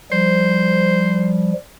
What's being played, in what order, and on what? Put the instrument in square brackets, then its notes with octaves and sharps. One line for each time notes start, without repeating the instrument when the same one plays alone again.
[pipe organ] F3 G3 [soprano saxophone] C5